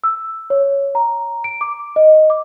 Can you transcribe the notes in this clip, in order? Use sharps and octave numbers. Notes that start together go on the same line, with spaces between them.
E6
C#5
A#5
D7
D6
D#5
D6